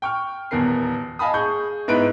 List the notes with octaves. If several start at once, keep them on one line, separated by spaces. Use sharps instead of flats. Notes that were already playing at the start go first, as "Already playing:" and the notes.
G5 C#6 F6
D#1 E2 B3 A#4 C7
D#5 F5 G#5 A5 B5 D#6
G#4 C#6 G6
G#2 B3 D#4 E4 B4 D7